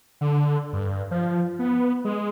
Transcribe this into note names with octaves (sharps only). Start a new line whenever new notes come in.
D3
G2
F3
B3
G#3